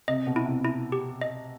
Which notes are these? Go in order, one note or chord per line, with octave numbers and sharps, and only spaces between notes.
C3 D#5
B2
E4
C3
E4
G4
D#5